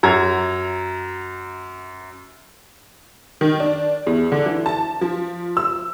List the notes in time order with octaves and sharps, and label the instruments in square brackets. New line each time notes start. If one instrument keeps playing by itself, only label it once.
[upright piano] F#2 A#5 G#6
[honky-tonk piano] D#3
D4
E2
D3
E3
A5
F3
E6